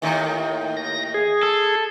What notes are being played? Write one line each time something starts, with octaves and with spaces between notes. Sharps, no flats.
D#2 A2 D#3
A#6
G#4
A4